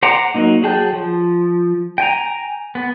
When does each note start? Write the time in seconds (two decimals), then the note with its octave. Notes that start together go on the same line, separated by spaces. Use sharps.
0.03 C5 F#5 A#5 D6
0.34 F#3 A#3 D#4
0.63 F#3 G#4 G5 A5 G6
0.93 F3
1.98 G5 G#5 A#5
2.75 B3